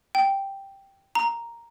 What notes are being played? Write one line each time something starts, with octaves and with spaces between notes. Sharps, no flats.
G5
A#5